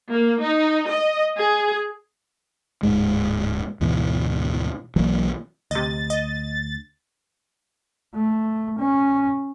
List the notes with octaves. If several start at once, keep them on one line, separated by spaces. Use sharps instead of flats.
A#3
D#4
D#5
G#4
D1 B1 G#2 G#3
D2 G#2 B2 E3
B1 E3 F#3 A#3
D2 C3 D#5 A6
D#5
A3
C#4